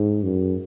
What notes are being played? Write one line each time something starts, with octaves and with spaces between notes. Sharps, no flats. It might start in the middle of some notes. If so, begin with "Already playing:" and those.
Already playing: G#2
F#2